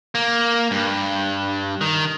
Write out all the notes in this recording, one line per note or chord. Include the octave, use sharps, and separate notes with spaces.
A#3
G2
D#3